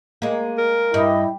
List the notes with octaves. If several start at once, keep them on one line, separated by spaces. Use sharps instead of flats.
G#3 A#3
A#4
G2 E4 D#5